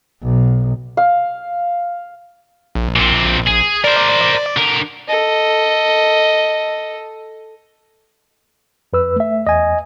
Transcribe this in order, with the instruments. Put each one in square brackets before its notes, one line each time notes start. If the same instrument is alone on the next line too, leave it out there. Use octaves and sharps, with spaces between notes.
[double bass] B1
[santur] F5
[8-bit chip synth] A#1
[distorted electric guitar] A#2 C4
G#4
[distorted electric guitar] A#4 C5 [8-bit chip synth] D5
[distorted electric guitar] D3 A#4
[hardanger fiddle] A4 D#5
[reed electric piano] F2 B4 E6
A3 E5
[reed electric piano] E2 [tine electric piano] D#5 G#5